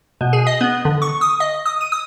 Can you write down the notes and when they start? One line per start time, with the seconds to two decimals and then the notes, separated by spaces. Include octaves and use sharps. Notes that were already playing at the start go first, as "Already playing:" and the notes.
0.21 B2
0.33 G#4
0.47 D#5
0.61 B3
0.85 D3
1.02 C#6
1.21 D#6
1.40 D#5
1.65 D#6
1.81 D#7
1.92 D#6